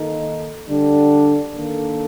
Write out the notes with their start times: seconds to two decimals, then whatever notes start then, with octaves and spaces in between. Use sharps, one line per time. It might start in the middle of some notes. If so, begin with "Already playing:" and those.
Already playing: D#3 A#3 D#4 A4
0.66 D3 G3 D4 A4
1.55 D#3 A#3 D4 A4